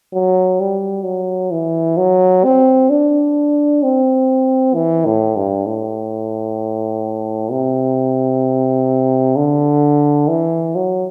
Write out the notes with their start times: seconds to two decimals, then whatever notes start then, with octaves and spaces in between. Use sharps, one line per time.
0.14 F#3
0.60 G3
1.05 F#3
1.52 E3
1.97 F#3
2.45 C4
2.90 D4
3.83 C4
4.75 E3
5.06 A2
5.36 G2
5.67 A2
7.51 C3
9.36 D3
10.28 E3
10.75 F#3